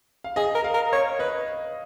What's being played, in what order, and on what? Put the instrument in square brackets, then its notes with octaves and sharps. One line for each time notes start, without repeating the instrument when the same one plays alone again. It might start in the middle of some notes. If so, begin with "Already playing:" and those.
[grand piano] F5
[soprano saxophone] G#4 [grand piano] D#5
[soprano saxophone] A#4
[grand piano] F5
[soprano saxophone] A#4
[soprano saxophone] C#5 [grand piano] F5
[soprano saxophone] B4 [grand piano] D#5